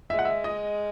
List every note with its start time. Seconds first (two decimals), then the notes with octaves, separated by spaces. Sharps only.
0.10 G#3 E5
0.19 F#5
0.25 E5
0.44 D#5